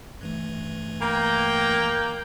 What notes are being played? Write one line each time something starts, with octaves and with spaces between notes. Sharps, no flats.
G2 E3 A3
A#3 G5 A#5